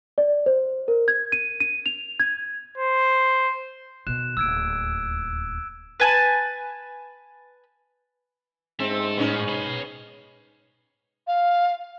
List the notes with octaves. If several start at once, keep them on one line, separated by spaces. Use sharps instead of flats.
D5
C5
A#4
G#6
D#7
D#7
F7
G#6
C5
B2 D#3 F#6 E7
D1 D#2 E6 G#6 D7
B4 G#5 A5
G#2 C4 E5 A5
A2 B3 C#4 D#4
C#5 B5
F5